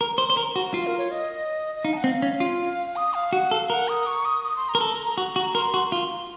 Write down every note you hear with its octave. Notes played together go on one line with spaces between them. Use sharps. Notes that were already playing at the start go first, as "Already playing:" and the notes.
A#4
C5
C5
A#4
F#4
F#5
F4 F5
A#4
C#5
D#5
D#5
D#4 F5
A5
F#5
C4
F5
C#4
F4
D#6
F5
F#4 F#5
A4 F5
A#4 F#5
D#6
C#6
D#6
D#6
C6
A#5
A#4
A4 A#5
F#4
F#4
A#4 C6
F#4
F4